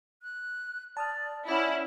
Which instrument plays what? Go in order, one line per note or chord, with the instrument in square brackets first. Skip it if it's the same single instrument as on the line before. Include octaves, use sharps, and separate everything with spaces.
[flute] F#6
[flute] D5 [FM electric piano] A5 D#6 F6
[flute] C#4 [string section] E4 [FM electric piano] D5 F#5